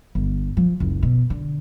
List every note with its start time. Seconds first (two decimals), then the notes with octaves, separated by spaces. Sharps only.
0.15 G1
0.57 F3
0.80 F#1 C#2
1.03 B2
1.30 D3